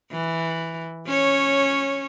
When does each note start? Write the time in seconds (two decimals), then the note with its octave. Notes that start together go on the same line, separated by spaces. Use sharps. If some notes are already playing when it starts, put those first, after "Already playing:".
0.11 E3
1.07 C#4 C#5